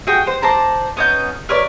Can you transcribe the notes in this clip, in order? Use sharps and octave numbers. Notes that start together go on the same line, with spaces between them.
F#4 G#4 G5
C5
C5 D5 A5 A#5
B3 C#4 D#4 G6
A#4 B4 C#5 D5